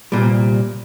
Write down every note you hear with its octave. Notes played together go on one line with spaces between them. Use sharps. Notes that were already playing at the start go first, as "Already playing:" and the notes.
C2 F#2 A#2 G3